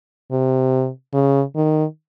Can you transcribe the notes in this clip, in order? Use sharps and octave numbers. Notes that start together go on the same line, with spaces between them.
C3
C#3
D#3